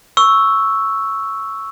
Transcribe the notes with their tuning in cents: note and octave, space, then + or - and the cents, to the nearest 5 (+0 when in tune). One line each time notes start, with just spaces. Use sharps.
C#6 +0 E6 +0